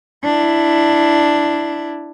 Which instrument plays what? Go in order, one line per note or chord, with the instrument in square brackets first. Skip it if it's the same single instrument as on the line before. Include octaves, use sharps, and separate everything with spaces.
[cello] D4 E4